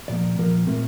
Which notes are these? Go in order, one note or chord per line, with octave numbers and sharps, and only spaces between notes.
A#2 F3 A#3 D5
A#2 F3 A#3 A#4
A#2 A3 C4 A#4